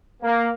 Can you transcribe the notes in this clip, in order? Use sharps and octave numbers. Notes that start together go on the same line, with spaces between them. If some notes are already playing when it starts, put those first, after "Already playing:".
A#3